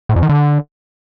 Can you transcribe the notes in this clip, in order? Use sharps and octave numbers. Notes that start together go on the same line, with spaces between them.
A2
F2
D#3
D3